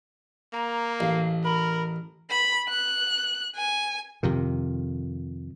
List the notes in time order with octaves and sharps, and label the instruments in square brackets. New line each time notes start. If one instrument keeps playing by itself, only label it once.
[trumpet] A#3 [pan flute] A#5
[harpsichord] A1 [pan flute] F5
[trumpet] A#4 [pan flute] B5
[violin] B5
F#6
G#5
[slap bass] F2 C3 D#3